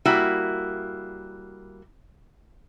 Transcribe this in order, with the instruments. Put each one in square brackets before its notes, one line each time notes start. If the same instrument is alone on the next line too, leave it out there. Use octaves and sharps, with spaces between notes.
[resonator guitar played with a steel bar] G3 A#3 E4 F#4